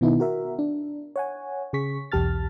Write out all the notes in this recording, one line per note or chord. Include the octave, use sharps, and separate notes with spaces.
B2 D#3 B3 D#4 E4
F#4 A#4 E5
D4
C#5 F#5 G#5
C#3 G#4 C#6 B6
B1 E2 G4 A5 F6 A6